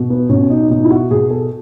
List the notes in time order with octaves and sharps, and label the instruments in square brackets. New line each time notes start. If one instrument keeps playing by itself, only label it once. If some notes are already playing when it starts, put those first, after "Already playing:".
Already playing: [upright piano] B2
B3
B2 C#4
D#4
B2 D#4
E4
F#4
B2 G#4
A4